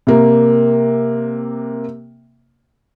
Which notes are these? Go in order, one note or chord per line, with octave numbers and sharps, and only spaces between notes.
C3 A#3